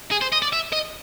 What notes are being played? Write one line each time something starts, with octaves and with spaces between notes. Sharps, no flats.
G#4
C5
D#5
D5
E5
D#5